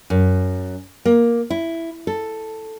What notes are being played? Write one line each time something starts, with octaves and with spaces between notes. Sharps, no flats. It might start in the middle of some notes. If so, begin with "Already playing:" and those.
F#2
A#3
E4
A4